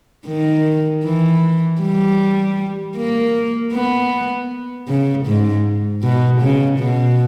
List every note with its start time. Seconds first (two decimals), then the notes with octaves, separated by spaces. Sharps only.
0.27 D#3
1.04 E3
1.82 G3
2.97 A#3
3.73 B3
4.88 C#3
5.27 G#2
6.03 B2
6.42 C#3
6.79 B2